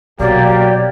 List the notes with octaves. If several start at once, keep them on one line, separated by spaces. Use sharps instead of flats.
B2 F#3 A#3 G4 D5